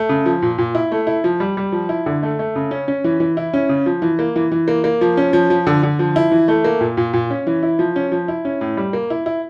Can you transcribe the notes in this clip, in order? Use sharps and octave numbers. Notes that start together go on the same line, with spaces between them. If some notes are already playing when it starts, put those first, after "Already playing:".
Already playing: A3
C#3
F3
A#2
A#2
E4
A3
E4
F3
G3
G3
F3
E4
D3
A3
A3
C#3
C#4
C#4
E3
E3
E4
C#4
C#3
F3
E3
A#3
E3
E3
A#3
A#3
F3
C#4
F3
F3
D3
D3
F3
E4
E3
A3
A#3
A#2
A#2
A#2
C#4
E3
E4
F3
C#4
F3
E4
C#4
A2
G3
A#3
E4
E4